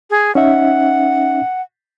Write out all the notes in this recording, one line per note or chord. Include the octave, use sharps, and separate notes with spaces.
G#4
C#4 D#4 E5 F#5